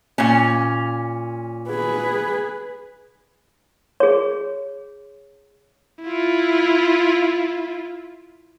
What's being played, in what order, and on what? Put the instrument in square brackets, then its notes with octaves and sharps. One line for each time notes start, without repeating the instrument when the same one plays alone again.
[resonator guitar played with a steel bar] A#2 C#4
[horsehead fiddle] G#4 B4
[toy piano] G#4 C#5
[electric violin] E4 F4